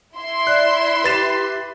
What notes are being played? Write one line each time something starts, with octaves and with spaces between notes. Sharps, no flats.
E4 E5 C6
D5 F#6
G4 B4 A6 E7